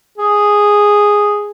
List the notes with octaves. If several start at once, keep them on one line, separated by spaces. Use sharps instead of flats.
G#4